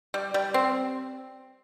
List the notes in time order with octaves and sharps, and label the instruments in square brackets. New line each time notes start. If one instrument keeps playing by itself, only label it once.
[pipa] G3
G3
C4